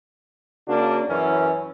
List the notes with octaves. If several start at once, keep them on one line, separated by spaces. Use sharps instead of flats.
C#3 A#3 D4 F#4
F#2 E3 C#4